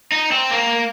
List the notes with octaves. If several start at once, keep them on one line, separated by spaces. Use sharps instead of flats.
D#4
C4
A#3